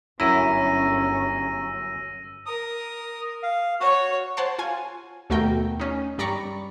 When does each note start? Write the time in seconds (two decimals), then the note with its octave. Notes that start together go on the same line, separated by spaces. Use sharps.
0.20 G1 F#2 C#4 E4 A#5 E6 A#6 D#7
2.46 A#4 D#6
3.43 F5
3.80 F#4 C#5
4.37 C5 C#5 F#5 A5 C6
4.59 F4 G#5
5.30 D#2 B2 A3 F#4 A#4 G5
5.80 C#4 D#4
6.18 G2 G3 D5 A#5 B5 C#6